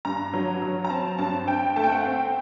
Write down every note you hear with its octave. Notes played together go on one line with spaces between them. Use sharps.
G2 A#5
F#3
F#3
A#5
C4 A5
G2 A5
C4 G5
A3 A5
G5
F#5
C4 G5